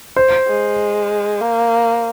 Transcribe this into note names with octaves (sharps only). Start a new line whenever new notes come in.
C5
G#3
A#3